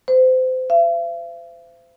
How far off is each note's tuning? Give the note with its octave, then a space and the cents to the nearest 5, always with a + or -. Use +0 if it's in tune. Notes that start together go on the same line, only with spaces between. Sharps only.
C5 -30
E5 +45